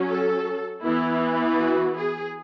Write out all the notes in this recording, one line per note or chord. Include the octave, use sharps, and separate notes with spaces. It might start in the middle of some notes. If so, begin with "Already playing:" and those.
Already playing: F#3 C#4
A4
E3 B3 E4
F#4
G#4